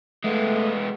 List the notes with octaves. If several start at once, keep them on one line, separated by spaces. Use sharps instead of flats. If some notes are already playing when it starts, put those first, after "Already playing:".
G#3 A3 B3